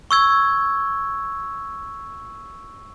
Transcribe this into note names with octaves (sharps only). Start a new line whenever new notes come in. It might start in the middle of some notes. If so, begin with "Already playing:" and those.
C#6 E6 G#6